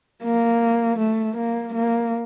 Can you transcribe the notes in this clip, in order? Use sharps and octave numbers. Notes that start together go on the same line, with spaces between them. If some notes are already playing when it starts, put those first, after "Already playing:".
A#3
A3
A#3
A#3